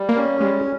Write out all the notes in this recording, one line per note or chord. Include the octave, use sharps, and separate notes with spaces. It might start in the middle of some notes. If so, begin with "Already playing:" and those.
Already playing: G3
A#3
C#4
G3 G#3